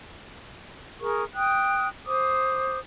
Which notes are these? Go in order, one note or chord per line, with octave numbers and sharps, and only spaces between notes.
G#4 A#4 C#6
G5 D#6 F#6
C5 D6 D#6